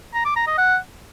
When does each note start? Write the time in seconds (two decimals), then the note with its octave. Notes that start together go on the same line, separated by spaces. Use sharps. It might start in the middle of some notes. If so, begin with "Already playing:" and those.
0.14 A#5
0.25 D6
0.36 A#5
0.47 D#5
0.58 F#5